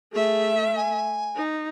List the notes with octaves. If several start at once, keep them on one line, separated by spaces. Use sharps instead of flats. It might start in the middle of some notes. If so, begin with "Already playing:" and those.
A3 G#4 E5
G#5
D#4